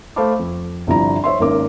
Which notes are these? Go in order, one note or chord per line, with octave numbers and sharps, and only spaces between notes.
A3 C5 F5 A5 B5 D6
F2
G1 C3 F3 E4 D5 A#5
C5 C#5 E5 C6
G#1 A#3 C#4 A#4 D6